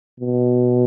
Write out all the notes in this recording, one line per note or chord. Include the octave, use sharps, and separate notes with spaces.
B2